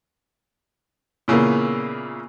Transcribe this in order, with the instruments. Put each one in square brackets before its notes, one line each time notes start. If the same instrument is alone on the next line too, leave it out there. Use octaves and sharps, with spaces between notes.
[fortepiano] A#2 C#3 E3 A#3 B3